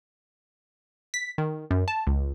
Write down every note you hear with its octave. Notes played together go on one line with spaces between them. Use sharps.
B6
D#3
F#2
A5
C#2